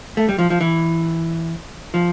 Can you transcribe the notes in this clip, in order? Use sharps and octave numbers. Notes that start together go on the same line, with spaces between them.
A3
G3
F3
F3
E3
F3